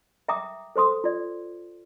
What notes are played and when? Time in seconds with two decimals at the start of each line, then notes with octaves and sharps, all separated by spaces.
0.29 E5 G5 A#5 D6 D#6
0.76 A4 C5 C6 D#6
1.04 F4 D5